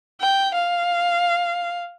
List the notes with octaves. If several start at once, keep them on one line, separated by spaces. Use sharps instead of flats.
G5
F5